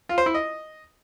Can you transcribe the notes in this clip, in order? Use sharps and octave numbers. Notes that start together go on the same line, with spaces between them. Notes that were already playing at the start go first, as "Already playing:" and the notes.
F4
C5
E4
D#5